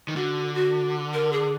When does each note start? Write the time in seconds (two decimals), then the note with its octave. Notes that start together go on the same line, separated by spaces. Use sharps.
0.08 D#3
0.16 D3 F#4
0.55 F#4
1.13 A#4
1.32 G#4